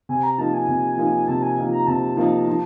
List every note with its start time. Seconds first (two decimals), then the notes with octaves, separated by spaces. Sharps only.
0.09 C3 G#5
0.23 A#5
0.38 F3 A#3 D#4 A5
0.54 G#5
0.68 C3
0.98 F3 A#3 D#4
1.28 C3 A5
1.43 G#5
1.58 F3 A#3 D#4
1.73 A#5
1.87 C3 A5
2.17 F3 A#3 D#4
2.48 F3